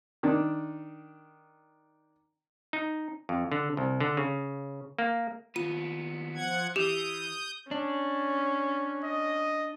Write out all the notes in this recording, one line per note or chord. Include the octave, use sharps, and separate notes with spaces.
D#3 D4
D#4
F2
D3
C2
D3
C#3
A#3
D#2 B3 F4 D#7
F3 F#5 G#6
E3 G4 D#6 G6 F7
C#4 D4
D#5